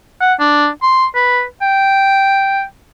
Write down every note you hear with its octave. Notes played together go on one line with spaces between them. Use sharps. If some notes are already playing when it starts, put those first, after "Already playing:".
F#5
D4
C6
B4
G5